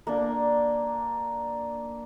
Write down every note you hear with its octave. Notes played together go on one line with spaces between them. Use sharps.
A#3 D4